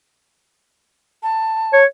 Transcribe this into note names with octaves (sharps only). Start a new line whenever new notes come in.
A5
C#5